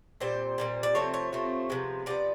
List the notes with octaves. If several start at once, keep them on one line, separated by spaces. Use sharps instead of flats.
A#2 G3 C4 C5
A#2 G3 C4
D5
C3 F3 A3 C4 C#5
C#5
C3 F3 A3 C4
C3 F3 G#3 B3
C3 F3 B3 D5